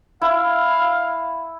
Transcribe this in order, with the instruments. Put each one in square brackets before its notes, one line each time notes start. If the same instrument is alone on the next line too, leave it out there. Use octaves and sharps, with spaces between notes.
[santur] E4 [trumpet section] F5